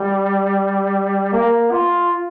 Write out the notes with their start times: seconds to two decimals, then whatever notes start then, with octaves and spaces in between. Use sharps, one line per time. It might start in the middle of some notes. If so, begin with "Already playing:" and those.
Already playing: G3
1.33 A#3
1.71 F4